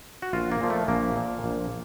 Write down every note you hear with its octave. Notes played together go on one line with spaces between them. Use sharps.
F#4
A#1 F4
A#3
A#2 F3
A3
A#1 A#3
A#2 F3
A#1